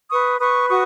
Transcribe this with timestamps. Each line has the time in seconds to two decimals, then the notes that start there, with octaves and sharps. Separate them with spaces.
0.11 B4 C#6 D#6
0.41 B4 C#6 D#6
0.69 F#4 C#6 D#6